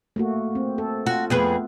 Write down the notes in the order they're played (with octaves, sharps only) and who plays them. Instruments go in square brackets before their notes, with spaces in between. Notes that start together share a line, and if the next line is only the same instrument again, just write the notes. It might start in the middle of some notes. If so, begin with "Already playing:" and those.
[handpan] A3 A#3 F#4
C4
A4
[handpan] F4 [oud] F#4
[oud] F2 G#4 B4 [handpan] A3 B3